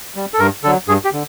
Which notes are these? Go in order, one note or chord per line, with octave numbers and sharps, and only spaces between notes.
G3
A4
G2 A#4
D3 F#3 A4
G2 G#4
G4
D3